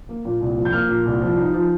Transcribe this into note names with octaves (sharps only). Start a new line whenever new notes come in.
A#3
A#2
C2
F3
G6
A#3 F6
A#2
C2
F3
D#4
F3